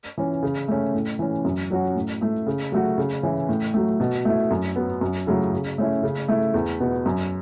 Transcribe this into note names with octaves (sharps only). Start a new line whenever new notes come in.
E3 C#4
C#3
A3 C#4
A2
E3 C#4
F#2
F#3 C#4 F#4
A2
A3 E4
C#3
F#3 A3 F#4
C#3
E3 C#4 E4
A2
F#3 A3
B2
A3 E4
F#2
F#3 B3
F#2
C#3 F#3 A3 E4
C#3
A3 C#4 E4
C#3
A3 E4
E2
B2 B3
F#2